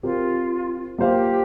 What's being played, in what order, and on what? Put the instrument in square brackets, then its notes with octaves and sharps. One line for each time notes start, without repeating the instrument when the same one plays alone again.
[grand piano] C4 G4 A#4 [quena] F4
[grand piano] A#3 F4 C5 F5 [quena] G4